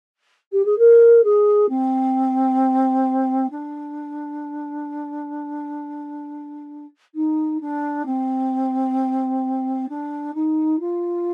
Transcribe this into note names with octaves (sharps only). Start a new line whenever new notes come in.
G4
G#4
A#4
G#4
C4
D4
D#4
D4
C4
D4
D#4
F4